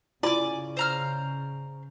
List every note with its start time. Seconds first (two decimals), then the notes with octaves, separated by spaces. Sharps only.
0.23 C#3 E4 F4 D5 G#5 D6
0.77 C5 A#5 F6